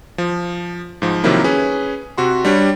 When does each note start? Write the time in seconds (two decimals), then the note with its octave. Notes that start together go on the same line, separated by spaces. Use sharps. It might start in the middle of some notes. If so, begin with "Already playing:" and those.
0.18 F3
1.02 G#2 F3
1.24 C3 D#3 F3 F#3 A#3 E4
1.44 C#4 G#4 B4
2.18 C3 F#4 C6
2.45 G3 D4 C#5